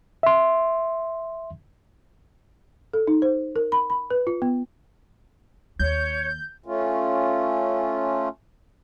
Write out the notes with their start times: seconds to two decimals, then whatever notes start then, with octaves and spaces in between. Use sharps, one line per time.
0.23 E5 C6
2.93 A4
3.07 D#4
3.22 C5
3.56 A#4
3.72 B5
3.90 B5
4.11 B4
4.27 F4
4.42 B3
5.79 D#2 C#5 G6
6.66 A3 C#4 F4